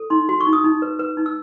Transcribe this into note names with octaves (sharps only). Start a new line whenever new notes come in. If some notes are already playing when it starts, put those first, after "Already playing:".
Already playing: A4
D#4 C6
F#4 C6
C#6
D#4
D#6
D#4
B4
B4
D#4
E6